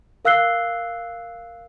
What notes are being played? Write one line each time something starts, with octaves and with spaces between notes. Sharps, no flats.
A#4 F5 E6 F#6 C7 G7